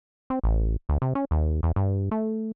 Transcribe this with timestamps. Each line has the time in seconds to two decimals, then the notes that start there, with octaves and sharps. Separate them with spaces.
0.30 C4
0.44 A1
0.89 D2
1.02 C3
1.15 C#4
1.31 D#2
1.63 E2
1.76 G2
2.11 A3